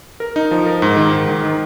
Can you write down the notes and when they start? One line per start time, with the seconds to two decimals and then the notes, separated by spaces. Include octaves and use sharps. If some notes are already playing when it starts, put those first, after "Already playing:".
0.20 A#4
0.36 D#4
0.51 F3
0.66 A#4
0.82 G#2
0.97 D#3
1.12 G#2
1.29 D#3
1.44 D#3